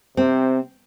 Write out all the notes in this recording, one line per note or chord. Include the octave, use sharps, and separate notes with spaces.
C3 C4